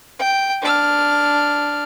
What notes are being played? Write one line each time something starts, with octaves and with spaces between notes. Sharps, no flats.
G5
D4 F6